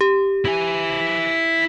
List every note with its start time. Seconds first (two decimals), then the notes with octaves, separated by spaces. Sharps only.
0.01 G4
0.45 E4 G#5